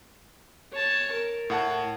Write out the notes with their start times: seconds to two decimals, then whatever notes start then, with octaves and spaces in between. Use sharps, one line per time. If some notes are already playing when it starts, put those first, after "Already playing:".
0.73 C#5 A5
1.12 A#4
1.50 A2 F#5 A5